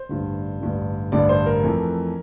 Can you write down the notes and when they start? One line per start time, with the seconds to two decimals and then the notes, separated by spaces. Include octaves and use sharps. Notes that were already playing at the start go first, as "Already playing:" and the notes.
Already playing: C5
0.09 A1 G2 D3
0.61 A1 G2 D3
1.12 A1 G2 D3 D5
1.29 C5
1.46 A#4
1.63 F2 E3 A3